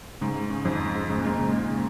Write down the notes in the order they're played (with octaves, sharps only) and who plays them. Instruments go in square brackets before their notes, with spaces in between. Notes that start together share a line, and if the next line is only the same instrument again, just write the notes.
[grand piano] G#2 [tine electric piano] C#3
[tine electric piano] G#3
C#3
[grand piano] F2 [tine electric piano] D#4
[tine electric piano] C#3
G#3
[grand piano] G#2 [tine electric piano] C#3
[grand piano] A#2
[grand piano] G#2 [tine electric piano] D#4
[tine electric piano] C#3
[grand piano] A#2 [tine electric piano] G#3
[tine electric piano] C#3